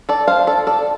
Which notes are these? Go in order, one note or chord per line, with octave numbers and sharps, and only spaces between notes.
A4 D5
F3 D4 C5 F5
A4 D5
A4 D5